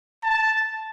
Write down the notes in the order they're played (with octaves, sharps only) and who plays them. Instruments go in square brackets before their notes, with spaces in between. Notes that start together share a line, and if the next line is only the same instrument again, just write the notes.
[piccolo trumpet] A5